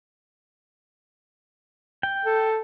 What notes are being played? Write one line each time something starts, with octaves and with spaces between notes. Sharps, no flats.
G5
A4